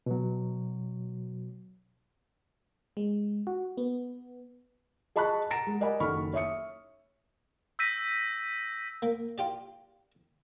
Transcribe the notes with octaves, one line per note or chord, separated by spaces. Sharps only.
B2 F#3
G#3
F#4
B3
G#4 D#5 A5 B5 C#6 F#6
F#5 A#5 A6 A#6 D7 E7
G#3
A#4 D5 D#5 F#5 G#5 B5
F#1 D#3 A4 B5 C#6 F6
C#5 E5 D#6 C#7
E6 G6 A#6 B6 D#7
A#3
F4 G4 D5